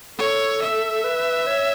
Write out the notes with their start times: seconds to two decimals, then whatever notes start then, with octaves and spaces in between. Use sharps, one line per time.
0.19 A4 C#5
0.62 E5
1.04 B4
1.47 C#5